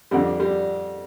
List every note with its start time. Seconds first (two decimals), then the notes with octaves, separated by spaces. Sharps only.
0.11 F2 D3 G3
0.40 G3